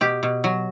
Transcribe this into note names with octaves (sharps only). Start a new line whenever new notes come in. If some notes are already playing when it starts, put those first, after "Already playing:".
B2 G4
B2
F#3